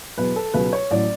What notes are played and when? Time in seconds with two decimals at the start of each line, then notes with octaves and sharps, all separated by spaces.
0.17 E2 B2 F#3 B4
0.36 A4
0.54 C#2 B2 F#3 B4
0.73 C#5
0.91 A1 A2 F#3 D5